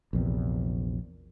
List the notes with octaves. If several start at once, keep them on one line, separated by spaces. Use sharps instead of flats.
A#1 E2 C3